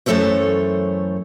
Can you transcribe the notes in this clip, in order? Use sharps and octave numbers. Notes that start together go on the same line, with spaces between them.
F#2 E3 A3 A4 C5 C#5